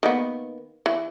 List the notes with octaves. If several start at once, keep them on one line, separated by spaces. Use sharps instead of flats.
D#3 A#3 B3
E3